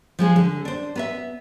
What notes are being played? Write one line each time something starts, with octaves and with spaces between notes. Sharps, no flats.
F3 G#3 G#4
D3
D4 C5
B3 B4 E5